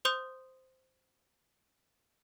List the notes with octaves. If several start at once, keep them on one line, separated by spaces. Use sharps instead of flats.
C5 C6 D#6 G6